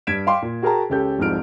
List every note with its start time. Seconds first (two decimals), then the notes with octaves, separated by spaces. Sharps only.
0.07 G2 G#6 B6 D7 E7
0.27 F5 G5 C6 D6
0.42 A#2
0.62 F#4 G#4 A#4 G5 A5 A#5
0.90 C#2 C#4 G4 A4 G6
1.18 F1 C2 G#2 F3 F6 D7